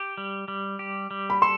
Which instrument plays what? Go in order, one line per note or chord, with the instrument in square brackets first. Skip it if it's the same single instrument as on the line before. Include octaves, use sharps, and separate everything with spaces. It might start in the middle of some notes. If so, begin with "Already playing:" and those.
Already playing: [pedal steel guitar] G4
G3
G3
G4
G3
[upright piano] B5
[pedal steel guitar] A4 [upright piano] C6